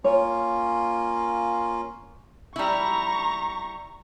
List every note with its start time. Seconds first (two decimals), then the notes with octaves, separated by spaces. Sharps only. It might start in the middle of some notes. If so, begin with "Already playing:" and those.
0.04 A#3 C#4 F4 C#5
2.56 G3 E4 A#5 C#6